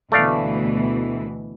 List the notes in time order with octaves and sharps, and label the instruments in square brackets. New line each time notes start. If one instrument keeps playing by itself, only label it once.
[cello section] D2 B2 E3 [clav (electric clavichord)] A3 D5 F5